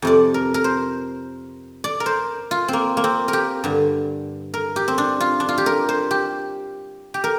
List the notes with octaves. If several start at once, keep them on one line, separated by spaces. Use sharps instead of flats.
F2 C3 D5
A#4
A#4
C5
D5
A#4
C5
F4
A#3 C4
A#3
C4
A#4
G4
G2 D3
A#4
G4
C4
D4
F4
D4
F4
G4
A#4
C5
G4
G4
A#4